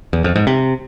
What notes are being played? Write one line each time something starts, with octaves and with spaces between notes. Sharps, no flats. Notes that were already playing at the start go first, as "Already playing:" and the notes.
E2
F2
G#2
C3